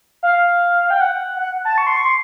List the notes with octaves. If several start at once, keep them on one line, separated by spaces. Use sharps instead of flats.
F5
G5
F#5
F#5
A5
C#6
C6
C#6
C6